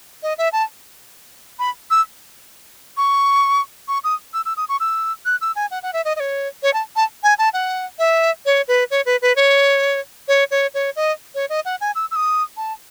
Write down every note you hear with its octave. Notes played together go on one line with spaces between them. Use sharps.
D#5
E5
A5
B5
E6
C#6
C#6
D#6
E6
E6
D#6
C#6
E6
F#6
E6
G#5
F#5
F#5
E5
D#5
D#5
C#5
C#5
A5
A5
G#5
A5
F#5
E5
C#5
B4
C#5
B4
B4
C#5
C#5
C#5
C#5
D#5
C#5
D#5
F#5
G#5
E6
E6
D#6
A5